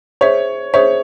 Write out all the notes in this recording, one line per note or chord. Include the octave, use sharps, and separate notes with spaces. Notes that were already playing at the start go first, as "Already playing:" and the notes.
G#4 C5 C#5 E5
G#4 C5 C#5 E5